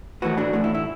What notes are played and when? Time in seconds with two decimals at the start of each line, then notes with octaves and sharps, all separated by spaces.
0.22 A2 E3 A3 F#4 B4
0.38 D4 F#4
0.53 A2 E3 A3 D4
0.64 E4
0.75 E4